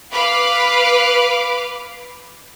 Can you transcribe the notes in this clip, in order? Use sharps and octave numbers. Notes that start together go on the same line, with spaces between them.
B4 F5 B5 D6